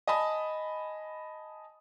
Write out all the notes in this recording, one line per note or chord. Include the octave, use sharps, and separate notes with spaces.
D#5 G#5 A5 B5